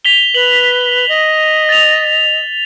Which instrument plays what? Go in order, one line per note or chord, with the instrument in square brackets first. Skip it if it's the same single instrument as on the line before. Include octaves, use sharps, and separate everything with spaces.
[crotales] B6 F7 G7
[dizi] B4 [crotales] F#7
[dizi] D#5
[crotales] A6 F7